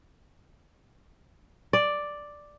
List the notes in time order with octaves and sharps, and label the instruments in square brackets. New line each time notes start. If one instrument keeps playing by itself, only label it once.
[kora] D5